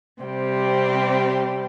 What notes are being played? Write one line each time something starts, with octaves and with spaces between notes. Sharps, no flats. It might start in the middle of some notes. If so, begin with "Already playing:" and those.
C3 G3 C4 G4